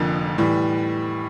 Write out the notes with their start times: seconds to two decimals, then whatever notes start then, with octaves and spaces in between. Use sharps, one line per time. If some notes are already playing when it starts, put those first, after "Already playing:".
Already playing: F1 F2 D3 F3 A#3
0.38 A2 E3 G3